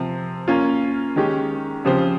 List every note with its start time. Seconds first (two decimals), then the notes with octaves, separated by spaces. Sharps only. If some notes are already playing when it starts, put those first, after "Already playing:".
Already playing: C3 F3 C4
0.48 A#3 C#4 F4
1.16 D#3 G#3 C#4 G4
1.85 C#3 F3 C4 G4 C5